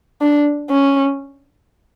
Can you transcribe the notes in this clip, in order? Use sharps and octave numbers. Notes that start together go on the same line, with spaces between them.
D4
C#4